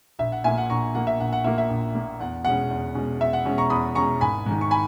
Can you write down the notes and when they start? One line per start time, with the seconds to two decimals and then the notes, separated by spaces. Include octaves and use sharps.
0.19 A#1 E5
0.32 F#5
0.44 A#2 A#3 E5 G#5
0.58 F#5
0.70 A#1 A#5 C#6
0.94 A#2 A#3 F#5
1.07 E5
1.20 A#1 F#5
1.33 F#5
1.44 A#2 A#3 E5
1.58 E5
1.70 A#1
1.95 A#2 A#3
2.20 E2 F#5
2.45 B2 G#3 C#4 F#5
2.70 E2
2.95 B2 G#3 C#4
3.20 E2 E5
3.33 F#5
3.45 B2 G#3 C#4
3.58 A#5 C#6
3.70 E2 B5 D#6
3.95 B2 G#3 C#4 A#5 C#6
4.21 G#1 G#5 B5
4.46 G#2 D#3
4.61 C#6
4.71 G#5 B5